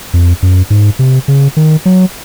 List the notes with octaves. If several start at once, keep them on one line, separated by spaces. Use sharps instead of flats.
F2
F#2
G#2
C3
C#3
D#3
F#3